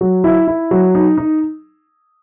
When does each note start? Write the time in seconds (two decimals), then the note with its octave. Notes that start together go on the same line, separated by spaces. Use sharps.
0.01 F#3
0.24 E4
0.48 E4
0.71 F#3
0.95 D#4
1.18 D#4